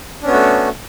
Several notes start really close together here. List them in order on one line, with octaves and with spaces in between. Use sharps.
D4 C#4 B3 F#4 A3